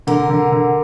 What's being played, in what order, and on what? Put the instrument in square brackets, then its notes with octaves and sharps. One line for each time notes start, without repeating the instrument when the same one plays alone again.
[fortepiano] D3 [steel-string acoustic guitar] A#4
[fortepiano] D3
D3